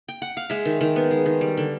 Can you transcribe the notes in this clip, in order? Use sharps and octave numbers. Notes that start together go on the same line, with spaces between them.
G5
F#5
F5
G#3 E5
D#3
D#3
B3
G#3
D#3
G3
D3